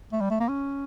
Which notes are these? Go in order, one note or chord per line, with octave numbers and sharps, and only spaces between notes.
A3
G3
A3
A#3
C#4